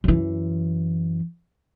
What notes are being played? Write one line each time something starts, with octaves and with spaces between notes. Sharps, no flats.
F#2 E3